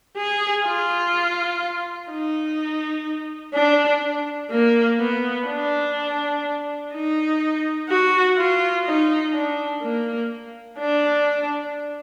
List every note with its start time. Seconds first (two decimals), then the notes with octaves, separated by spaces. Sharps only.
0.16 G#4
0.64 F4
2.09 D#4
3.54 D4
4.50 A#3
4.99 B3
5.47 D4
6.93 D#4
7.89 F#4
8.37 F4
8.85 D#4
9.34 D4
9.82 A#3
10.78 D4